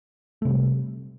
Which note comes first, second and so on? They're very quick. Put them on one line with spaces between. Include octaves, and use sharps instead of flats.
A3 C3 G3